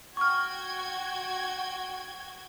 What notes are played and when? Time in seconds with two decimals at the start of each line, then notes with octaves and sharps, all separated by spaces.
0.17 F#4 G5 C#6 F6 G#6